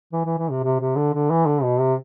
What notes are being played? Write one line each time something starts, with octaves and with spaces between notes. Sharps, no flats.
E3
E3
E3
C3
C3
C3
D3
D3
E3
D3
B2
C3